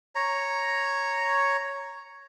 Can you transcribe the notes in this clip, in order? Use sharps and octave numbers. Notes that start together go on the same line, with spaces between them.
C#5 A#5